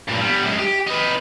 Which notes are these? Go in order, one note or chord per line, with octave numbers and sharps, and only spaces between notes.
G2 A#2
G3 B3
F#2 G#3
G4
D#4 B4